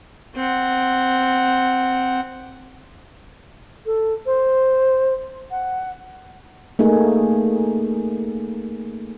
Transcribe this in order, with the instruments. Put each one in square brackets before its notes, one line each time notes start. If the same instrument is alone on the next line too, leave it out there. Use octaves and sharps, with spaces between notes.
[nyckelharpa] C4 F#5
[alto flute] A4
C5
F#5
[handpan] A3 A#3 D#4 G#4